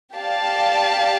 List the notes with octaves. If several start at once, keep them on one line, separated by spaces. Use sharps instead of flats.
G4 D5 F5 A5